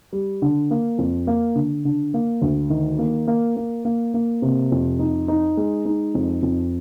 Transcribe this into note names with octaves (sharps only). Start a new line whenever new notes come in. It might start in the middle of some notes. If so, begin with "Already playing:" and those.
G3
D3
A#3
F2
A#3
D3
D3
A#3
D2
D#3
A#3
A#3
A#3
A#3
A#3
C3
F2
D#4
D#4
G#3
D#4
F2
F2